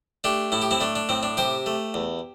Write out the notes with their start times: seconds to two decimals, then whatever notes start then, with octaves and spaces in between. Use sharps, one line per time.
0.24 A3 D4 G4
0.52 A2 E4
0.62 G4
0.71 C4 E4
0.80 A3 D4
0.96 D4
1.09 A2 C4
1.23 D4
1.37 C3 G4 C5
1.66 A3
1.94 E2